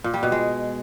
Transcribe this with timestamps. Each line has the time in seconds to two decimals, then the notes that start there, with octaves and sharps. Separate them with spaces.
0.04 A#2
0.14 G3
0.23 B2
0.32 G#3